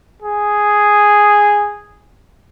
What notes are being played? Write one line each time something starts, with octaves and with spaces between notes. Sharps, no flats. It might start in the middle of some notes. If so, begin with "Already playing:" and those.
G#4